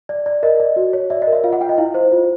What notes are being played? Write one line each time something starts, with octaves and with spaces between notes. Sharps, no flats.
D5
D5
A#4 D#5
D5
F#4
C#5
D5 E5
D#5
A#4
E5
F4 F5
F#5
F4 G5
D#5
E4 F5
C5
F4